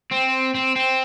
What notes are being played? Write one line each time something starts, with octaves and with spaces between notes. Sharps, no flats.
C4
C4
C4